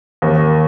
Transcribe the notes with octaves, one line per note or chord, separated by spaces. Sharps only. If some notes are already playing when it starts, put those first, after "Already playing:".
D#2